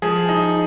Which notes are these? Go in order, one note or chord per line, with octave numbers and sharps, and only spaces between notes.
F3 G#4
D#4